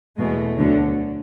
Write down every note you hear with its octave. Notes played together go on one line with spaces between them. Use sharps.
E2 B2 G#3 A3
D2 D3 F#3